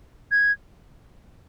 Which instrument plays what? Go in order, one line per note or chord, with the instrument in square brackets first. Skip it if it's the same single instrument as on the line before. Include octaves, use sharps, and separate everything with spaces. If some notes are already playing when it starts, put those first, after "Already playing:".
[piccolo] G#6